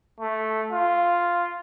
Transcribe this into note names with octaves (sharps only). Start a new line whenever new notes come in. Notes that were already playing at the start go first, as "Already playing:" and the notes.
A3
F4